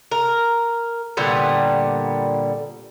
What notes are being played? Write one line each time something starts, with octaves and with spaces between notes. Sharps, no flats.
A#4
A#2 D3 G3 B3